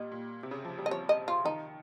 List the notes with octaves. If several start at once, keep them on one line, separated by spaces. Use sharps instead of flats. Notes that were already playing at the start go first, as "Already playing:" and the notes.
Already playing: A#2 G3 D#5
A#2
C3
C#3
F3
G3
D#5
F3 C#5
D#5
F4
D#3 D#4